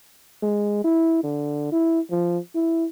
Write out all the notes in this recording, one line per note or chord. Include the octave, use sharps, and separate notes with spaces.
G#3
E4
D3
E4
F3
E4